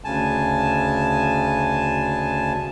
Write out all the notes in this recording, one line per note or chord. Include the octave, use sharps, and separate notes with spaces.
D2 C#3 G#5 A5